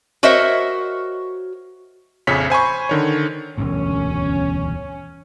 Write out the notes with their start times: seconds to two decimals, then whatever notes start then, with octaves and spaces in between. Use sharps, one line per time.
0.23 F#4 A#4 C5 C#5 D#5 E5
2.27 A#1 F2 C#3 C#4 C#5 B6
2.50 C5 G#5 B5 C#6
2.89 D3 D#3 C#5
3.58 E1 D2 G2 C#4